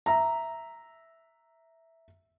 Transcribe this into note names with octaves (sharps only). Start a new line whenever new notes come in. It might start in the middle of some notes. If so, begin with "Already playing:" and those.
E5 A#5